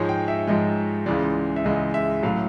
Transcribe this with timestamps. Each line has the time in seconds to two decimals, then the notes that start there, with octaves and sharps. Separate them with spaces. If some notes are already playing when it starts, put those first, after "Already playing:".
Already playing: G#2 F3 G#3 C#5
0.09 G5
0.28 E5
0.47 G#2 F3 G#3 D#5
1.06 C#2 C#3 E3 G#3 D5
1.56 E5
1.64 C#2 C#3 E3 G#3 D#5
1.94 E5
2.23 A2 F#3 F5